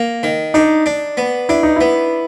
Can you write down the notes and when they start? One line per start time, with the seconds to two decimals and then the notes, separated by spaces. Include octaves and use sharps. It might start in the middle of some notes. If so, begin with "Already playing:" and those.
Already playing: A#3
0.23 D#3
0.54 D4 D#4
0.86 D4
1.17 B3
1.49 D4 E4
1.63 D#4
1.76 B3 E4